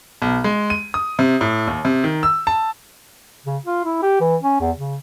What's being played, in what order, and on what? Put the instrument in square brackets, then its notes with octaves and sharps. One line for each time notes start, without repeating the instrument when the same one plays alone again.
[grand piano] B1
G#3
D#7
D#6
C3
A2
D#2
C3
D#3
E6
A5
[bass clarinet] C#3
F4
E4
G4
E3
C#4
E2
C#3